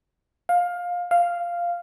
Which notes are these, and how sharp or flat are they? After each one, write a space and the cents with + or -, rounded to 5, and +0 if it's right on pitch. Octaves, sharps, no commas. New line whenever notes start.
F5 +20
F5 -5